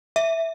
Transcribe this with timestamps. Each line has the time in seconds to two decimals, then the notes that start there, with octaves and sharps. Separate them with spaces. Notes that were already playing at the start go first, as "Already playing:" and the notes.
0.16 E5